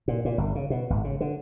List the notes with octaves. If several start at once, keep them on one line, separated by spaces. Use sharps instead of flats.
A#2
A#2
G1
C#3
B2
G#1
C#3
D3